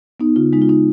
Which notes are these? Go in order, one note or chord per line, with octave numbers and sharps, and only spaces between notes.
B3 D#4
C#3 F4
G#3 D#4
F4
D#4